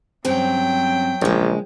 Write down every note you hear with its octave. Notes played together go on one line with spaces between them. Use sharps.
G2 F#3 C4 C#4 G5
A#1 C#3 G#3